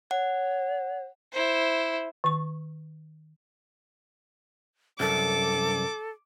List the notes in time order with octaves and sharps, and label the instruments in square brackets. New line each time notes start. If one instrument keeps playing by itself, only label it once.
[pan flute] C#5 [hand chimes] F#5
[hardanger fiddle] E4 C5
[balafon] D#3 C#6
[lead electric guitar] C2 F#2 [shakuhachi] A4 [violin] D6